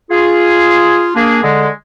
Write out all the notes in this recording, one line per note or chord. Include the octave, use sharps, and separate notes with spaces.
F4 G#4
A#3 D4 G#4
D3 G#3